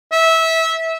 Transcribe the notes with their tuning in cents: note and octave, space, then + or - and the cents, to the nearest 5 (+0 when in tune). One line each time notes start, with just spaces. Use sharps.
E5 -20